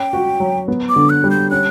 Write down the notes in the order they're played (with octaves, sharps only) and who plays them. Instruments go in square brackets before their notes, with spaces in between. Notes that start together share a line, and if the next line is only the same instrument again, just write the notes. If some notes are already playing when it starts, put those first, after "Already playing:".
Already playing: [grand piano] C#4 [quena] G5
[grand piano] F#4
F#3
B3
[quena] D6
[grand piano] D3
[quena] F#6
[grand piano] G3
[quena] G6
[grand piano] C#4 [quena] F#6